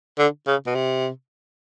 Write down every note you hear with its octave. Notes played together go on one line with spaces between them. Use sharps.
D3
C#3
B2
C3